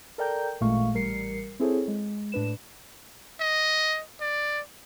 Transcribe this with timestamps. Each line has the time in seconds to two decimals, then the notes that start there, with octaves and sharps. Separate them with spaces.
0.18 A4 A#4 D5 G5 A#5 G6
0.61 A1 A#2 G#3 A3 F5 C#6
0.94 A1 G3 A#4 C7 C#7
1.60 C4 E4 G#4 A4 C5 C#5
1.88 G#3
2.32 A2 D4 B4 E7
3.40 D#5
4.21 D5